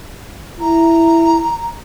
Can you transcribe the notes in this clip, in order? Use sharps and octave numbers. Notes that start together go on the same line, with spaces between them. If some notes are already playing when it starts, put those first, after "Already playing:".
E4 A#5